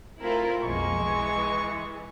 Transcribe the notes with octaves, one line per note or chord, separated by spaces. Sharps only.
A3 C4 E4 F4 A#4
B1 F2 G#3 A#3 C#6
E3